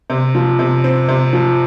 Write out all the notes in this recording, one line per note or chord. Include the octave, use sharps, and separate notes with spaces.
C3
F3
C3
C4
C3
F3